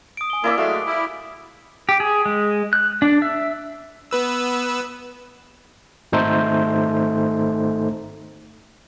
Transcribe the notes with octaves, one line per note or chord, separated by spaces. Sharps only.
D#6 D7
G#5 G7
A#3 E4 D5 E5
F#3 G#3 A3 F5
E4 G4
G4
G#4
G#3
F#6
D4
E5
B3 B4 E6
G#1 A3 D#4 A4 C5